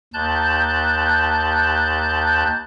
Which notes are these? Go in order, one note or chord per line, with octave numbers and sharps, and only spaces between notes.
D#2 A5 F#6 G6